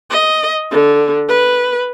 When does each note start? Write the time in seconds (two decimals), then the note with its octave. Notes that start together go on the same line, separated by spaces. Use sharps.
0.11 D#5
0.71 D3
1.29 B4